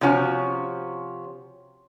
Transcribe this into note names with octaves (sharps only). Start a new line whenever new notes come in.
C3 F3 C#4 F#4